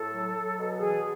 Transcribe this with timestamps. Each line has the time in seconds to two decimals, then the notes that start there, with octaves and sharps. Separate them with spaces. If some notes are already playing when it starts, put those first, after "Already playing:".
Already playing: A2 A4
0.10 F#3
0.33 F#3
0.57 B2
0.79 E3 G#4